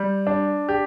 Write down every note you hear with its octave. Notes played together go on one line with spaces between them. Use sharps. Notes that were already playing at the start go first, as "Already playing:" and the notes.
Already playing: G3
D4
G4